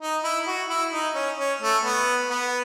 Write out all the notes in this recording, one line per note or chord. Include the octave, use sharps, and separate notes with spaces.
D#4
E4
F#4
E4
D#4
C#4
C#4
A3
B3
B3